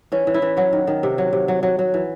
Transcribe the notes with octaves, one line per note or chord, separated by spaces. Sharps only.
E3 C#4
E3
E4
E3
F#3 F#4
D#3
D#3
C3
F#3
C3
F#3
F#3
F#3
E3